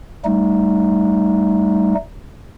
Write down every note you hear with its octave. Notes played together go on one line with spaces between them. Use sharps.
G3 A3 D#4